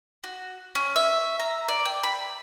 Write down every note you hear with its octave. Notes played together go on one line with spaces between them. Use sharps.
F#4
C#4
E5
A#5
D5
G5
B5